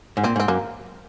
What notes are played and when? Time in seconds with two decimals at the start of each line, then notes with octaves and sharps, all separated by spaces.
0.17 G#2
0.23 A#2 C4
0.36 G#2
0.40 C4
0.48 F#2 A#3